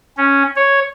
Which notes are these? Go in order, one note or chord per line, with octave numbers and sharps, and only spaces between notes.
C#4
C#5